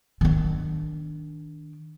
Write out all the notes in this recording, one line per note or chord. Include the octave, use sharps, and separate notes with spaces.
D#3 D4